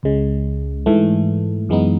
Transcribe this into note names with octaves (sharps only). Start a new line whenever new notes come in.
C#2 C#3 G#3
G#2 E3 A3
F#2 E3 G#3 B3 D#4